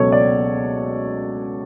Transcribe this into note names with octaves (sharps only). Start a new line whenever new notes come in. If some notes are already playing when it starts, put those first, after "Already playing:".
Already playing: C#2 B2 F#3 A4 C#5
D5